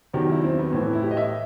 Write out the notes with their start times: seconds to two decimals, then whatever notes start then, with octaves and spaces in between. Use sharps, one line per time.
0.14 E2 D#3 F#3 G4
0.29 E4
0.44 C4
0.58 B3
0.73 A2 E3 C4
0.93 E4
1.03 G4
1.11 D#5
1.17 E5